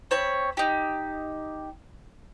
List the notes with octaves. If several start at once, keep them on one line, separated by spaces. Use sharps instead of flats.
C4 C#5 B5
D#4 G4